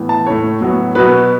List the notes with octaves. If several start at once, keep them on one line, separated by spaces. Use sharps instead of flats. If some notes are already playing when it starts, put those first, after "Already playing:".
Already playing: A2 E3 B3
A5
A2 A3 C#5
A2 F#3 B3
B2 F#3 B3 B4